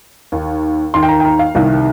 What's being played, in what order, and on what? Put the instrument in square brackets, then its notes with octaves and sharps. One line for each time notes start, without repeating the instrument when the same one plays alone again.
[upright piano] D#2 D#3
D#2 D#3 C6
G5
A#5
G5
A#5
F5
C2 C3 D#3 F5